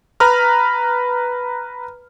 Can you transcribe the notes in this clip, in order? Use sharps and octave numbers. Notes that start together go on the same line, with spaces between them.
B4 A#5 B5 F6